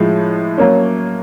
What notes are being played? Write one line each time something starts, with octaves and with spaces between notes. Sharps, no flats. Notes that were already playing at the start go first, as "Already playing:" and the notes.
Already playing: A2 F3 G#3
F#3 A#3 C#4